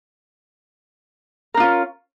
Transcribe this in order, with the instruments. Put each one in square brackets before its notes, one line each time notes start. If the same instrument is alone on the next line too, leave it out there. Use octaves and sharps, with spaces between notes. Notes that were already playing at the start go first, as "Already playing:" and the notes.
[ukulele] A#4
D4
F4
C#4